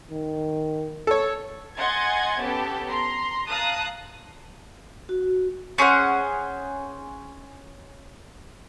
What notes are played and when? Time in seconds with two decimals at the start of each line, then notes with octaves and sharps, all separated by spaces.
0.11 D#3
1.07 A4 C#5
1.77 D#5 F#5 G#5 C6 G#6 A6
2.40 B3 C#4 G4 A4 A5
2.89 A#5 C6
3.48 F5 A5 A#5 D#6 F#6
5.09 F#4
5.78 C#4 G#4 C5 F#5